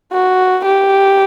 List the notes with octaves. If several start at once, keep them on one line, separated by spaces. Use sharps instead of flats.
F#4
G4